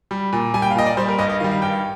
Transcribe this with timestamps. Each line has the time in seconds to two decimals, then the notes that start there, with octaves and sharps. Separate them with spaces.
0.11 G3
0.33 A#2
0.54 G3 G#5
0.62 G5
0.71 F5
0.75 A#2 D#5
0.86 D5
0.97 G3 C5
1.08 A#4
1.19 G2 D#5
1.29 D#5
1.40 D#3 G3 F5
1.51 F5
1.62 G2 G5